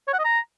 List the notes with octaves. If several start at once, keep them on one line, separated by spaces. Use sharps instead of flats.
C#5
F#5
D#5
A#5